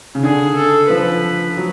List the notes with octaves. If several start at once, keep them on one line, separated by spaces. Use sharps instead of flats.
C#3
D3 G#4
A4
F3 B4
F#3